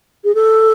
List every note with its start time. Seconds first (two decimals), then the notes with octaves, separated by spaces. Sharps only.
0.24 G#4
0.35 A4